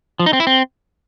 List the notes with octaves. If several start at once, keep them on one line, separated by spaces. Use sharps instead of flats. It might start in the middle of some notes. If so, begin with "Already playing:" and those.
F3
D#4
C4
E4
C4